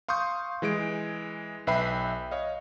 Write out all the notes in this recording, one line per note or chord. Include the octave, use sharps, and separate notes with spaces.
F5 C6 C#6 D#6 G6
E3 G#3 G#4 D7
B1 B4 E5 G5 B5 C7
C#5 D#5 F5